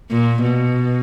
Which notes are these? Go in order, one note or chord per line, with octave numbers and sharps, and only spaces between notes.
A#2
B2